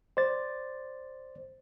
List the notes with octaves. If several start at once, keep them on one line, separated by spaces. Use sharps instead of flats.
C5 D5 A6